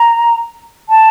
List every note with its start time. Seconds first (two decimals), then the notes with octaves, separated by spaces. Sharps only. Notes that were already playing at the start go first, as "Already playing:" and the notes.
Already playing: A#5
0.89 A5